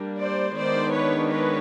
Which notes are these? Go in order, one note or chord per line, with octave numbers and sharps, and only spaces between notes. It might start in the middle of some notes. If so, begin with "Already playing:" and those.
Already playing: G3 A#3 D4
C5 D5
D#3 G#3 B3 D4 C5 D5
B4 C#5
B4 C#5